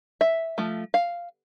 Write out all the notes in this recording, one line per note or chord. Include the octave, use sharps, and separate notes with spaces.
E5
F3 A3
F5